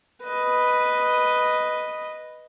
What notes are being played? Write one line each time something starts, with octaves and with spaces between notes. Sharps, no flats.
B4 D#5